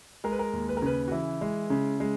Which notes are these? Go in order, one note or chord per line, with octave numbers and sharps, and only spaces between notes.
G#3 A#4
B4
A#4
D#2
B4
A#4
C#3 B4
F#4
E3 E4
G#3
C#3
G#3